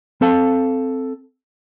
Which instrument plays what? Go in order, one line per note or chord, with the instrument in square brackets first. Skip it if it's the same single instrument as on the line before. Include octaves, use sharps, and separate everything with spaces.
[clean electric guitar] C4 A4 F5 A5